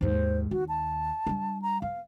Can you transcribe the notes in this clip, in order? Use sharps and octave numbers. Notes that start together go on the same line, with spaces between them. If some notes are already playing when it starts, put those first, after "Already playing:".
D#2 G#2 C5
D#2 F#4
A5
G3 D4
A#5
B3 F5